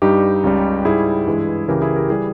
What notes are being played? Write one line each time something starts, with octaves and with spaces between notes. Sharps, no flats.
G2 G3 D#4 G4
C#2 C#3 G3
G#2 G3 E4 G#4
G2 E3 G#3
C#2 C#3 E3 G4 A#4
E4 G#4
G4 A#4
E3 G3 G#4 B4